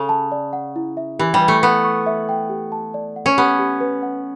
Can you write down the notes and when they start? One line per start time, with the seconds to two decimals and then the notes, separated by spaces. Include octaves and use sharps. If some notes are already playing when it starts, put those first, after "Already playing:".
Already playing: C#3 A4
0.09 A5
0.32 D5
0.53 F#5
0.76 E4
0.97 E5
1.19 E3 G4
1.34 G3
1.41 B4
1.48 A3
1.62 B3 B4
1.84 C#6
2.06 E5
2.29 G5
2.49 G4
2.72 A5
2.94 D5
3.16 F#5
3.26 C#4
3.37 B3 G4
3.59 G4
3.81 B4
4.03 F#5